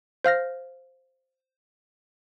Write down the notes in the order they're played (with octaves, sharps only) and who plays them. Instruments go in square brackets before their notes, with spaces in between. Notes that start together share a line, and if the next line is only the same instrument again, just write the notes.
[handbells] C5 F5 F6 A#6